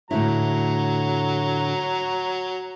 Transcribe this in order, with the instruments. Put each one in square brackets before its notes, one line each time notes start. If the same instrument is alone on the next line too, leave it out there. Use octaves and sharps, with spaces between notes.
[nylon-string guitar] A2 D3 E4 [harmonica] F#3 A#5